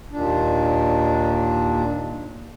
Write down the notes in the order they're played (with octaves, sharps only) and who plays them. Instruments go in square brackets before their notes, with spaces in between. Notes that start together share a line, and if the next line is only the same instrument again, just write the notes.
[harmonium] D#2 A#2 D4